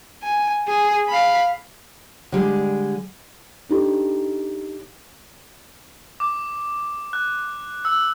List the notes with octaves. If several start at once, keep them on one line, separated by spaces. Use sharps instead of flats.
G#5
G#4
F5 B5
D3 G3 G#3
D4 D#4 G4 A4
D6
F#6
E6